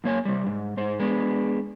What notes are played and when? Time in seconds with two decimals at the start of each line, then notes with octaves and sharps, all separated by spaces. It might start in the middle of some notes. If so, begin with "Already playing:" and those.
0.04 F#2 A#3 C#5 G#5
0.25 C3 G3
0.46 G#2
0.77 G#2 C5
1.00 G#3 B3 D4